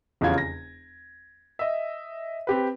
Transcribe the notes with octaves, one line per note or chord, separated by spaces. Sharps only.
F1 E2 C#3 C#4 F4 G#6
A#6
D#5 E5
C4 G4 B4